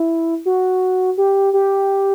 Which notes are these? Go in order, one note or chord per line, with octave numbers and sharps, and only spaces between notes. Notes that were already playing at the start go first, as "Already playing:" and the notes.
Already playing: E4
F#4
G4
G4